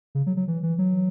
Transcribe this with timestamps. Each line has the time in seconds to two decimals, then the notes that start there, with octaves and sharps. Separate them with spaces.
0.15 C#3
0.26 F#3
0.37 F#3
0.48 E3
0.63 E3
0.78 F#3